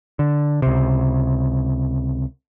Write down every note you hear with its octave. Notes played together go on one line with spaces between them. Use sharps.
D3
C#2 C3